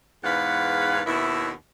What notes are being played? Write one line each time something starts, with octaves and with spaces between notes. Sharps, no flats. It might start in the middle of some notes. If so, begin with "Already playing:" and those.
E2 G#2 B4 F5 F#5
D#2 B2 E4